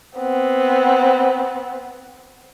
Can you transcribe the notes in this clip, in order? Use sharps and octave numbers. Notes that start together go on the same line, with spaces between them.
B3 C4